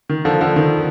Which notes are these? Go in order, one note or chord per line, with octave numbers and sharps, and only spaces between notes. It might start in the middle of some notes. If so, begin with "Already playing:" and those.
D#3
D3 F3
D3 F3
D#3